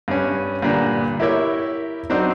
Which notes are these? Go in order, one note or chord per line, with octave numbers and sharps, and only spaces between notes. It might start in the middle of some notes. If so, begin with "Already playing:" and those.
G2 C#4
G2 A#2 D3
E4 G4 A#4 C#5 E5
F#3 C4 D4 D#4